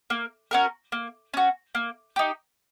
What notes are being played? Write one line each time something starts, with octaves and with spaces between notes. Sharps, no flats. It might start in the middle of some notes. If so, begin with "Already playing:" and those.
A#3
C#4 F#4 A#4
A#3
C#4 F#4
A#3
D#4 G4